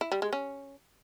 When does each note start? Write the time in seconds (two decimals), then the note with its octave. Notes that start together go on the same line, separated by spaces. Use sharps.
0.01 E4
0.12 G3
0.22 G#3
0.33 C#4